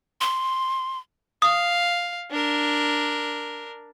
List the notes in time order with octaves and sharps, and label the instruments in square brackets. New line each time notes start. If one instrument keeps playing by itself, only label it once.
[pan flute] C6
[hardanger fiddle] F5 [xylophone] D#6
[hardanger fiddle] D4 A#4